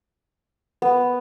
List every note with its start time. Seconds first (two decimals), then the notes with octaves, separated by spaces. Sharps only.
0.82 B3